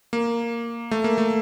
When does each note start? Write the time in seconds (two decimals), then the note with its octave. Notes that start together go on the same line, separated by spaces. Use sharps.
0.13 A#3
0.91 A3
1.04 A#3
1.18 A3